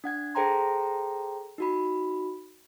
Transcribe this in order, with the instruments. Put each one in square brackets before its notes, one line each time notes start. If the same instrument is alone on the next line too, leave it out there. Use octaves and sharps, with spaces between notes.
[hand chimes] D4 F#5 G#6
G#4 A4 C5 G5 A#5 C6
D#4 F#4 B5